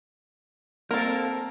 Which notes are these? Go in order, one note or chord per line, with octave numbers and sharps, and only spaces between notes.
A#3 C4 A4 A#4